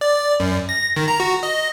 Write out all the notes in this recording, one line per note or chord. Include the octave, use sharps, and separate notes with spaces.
D5
F#2
A#6
D#3
A#5
F#4
D#5